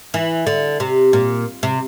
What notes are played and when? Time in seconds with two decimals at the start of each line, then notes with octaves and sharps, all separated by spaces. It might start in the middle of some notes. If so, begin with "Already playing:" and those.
0.14 E3
0.47 D3
0.80 C3
1.13 A#2
1.63 C3